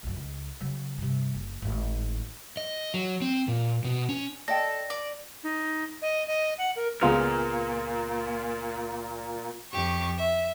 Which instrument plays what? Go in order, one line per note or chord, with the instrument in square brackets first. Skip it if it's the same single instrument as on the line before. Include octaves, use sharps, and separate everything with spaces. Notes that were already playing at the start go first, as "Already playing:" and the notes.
[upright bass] A#1 F#2
C#2
C#3 F#3
G2 C3
F#1
G#1 A2
[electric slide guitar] D#5
F#3
C4
A#2
B2
C#4
[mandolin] A4 [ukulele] D5 D#5 G5 [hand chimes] A#6
[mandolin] D5
[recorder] D#4
D#5
D#5
F#5
A#4
[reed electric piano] C#2 F4 F6 [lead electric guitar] A#2 [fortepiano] B3 G#4
[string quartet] F2 G4 C#6
E5